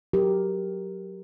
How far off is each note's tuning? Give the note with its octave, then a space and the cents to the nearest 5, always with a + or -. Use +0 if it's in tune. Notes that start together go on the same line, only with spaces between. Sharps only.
F#3 +0 G4 +0 A#4 +0